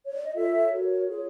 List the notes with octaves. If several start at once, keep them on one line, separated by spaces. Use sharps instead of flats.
C#5
D5
D#5
F4 A4 C#5 E5
F#4 A#4 C#5
F4 G#4 C#5